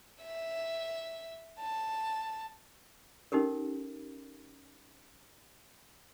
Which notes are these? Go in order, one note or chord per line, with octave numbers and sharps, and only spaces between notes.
E5
A5
C#4 D#4 G4 A4 A#4